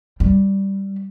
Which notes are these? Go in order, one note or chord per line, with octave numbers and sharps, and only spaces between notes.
G3